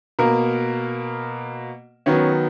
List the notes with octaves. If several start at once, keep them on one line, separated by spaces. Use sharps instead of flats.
B2 A#3 A#4
D#3 F#3 B3 C#4